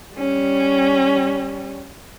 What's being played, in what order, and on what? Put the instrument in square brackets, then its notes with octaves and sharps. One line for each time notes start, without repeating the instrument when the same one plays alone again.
[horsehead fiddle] G3 C#4